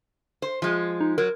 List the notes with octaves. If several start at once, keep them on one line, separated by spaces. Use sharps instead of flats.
C5
F3 G#3
D#4
F#3 A#4